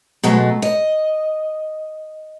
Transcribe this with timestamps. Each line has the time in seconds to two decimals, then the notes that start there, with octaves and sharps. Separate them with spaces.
0.23 B2 F#3 G#3 A3
0.62 D#5